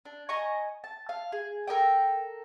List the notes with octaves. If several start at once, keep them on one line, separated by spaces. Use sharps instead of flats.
D4
D#5 G#5 A#5 C#6
A5
F5
G#4
A4 A#4 D#5 G5